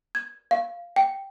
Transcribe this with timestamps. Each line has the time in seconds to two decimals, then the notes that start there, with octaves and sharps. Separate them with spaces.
0.15 G#6
0.51 F5
0.96 G5